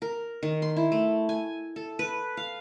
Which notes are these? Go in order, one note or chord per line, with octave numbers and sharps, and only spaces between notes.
A#4
D#3
C6
E4
A3
G#5
A4
B4
F5